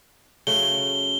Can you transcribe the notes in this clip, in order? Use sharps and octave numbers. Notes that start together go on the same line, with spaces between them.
C#3 F#3 A3 G7